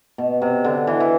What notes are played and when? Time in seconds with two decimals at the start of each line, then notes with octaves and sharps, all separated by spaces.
0.18 B2
0.42 C3
0.64 D3
0.87 E3
1.00 E3